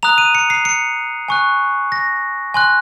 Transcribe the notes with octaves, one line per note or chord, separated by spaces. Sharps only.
A#5 D#6 F#6 F7
D#7
C#7
C7
C#7
G#5 C#6 F#6
A#6
G#5 C6 F#6